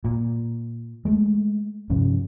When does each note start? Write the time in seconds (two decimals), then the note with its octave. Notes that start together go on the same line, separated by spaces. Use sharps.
0.04 A#2
1.05 G#3 A3
1.90 G2 C3 F3 C#4